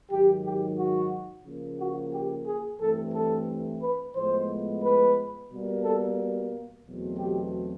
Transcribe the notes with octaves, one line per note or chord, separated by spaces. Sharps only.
G#2 D#3 F#3 G4
G4
F#4
C#3 F3 A#3
F#4
G4
G#4
G2 E3 A3 C4 A4
A4
B4
A2 F3 G#3 B3 C5
B4
B2 G3 A#3
A4
E2 B2 F#3 A3 C4
G4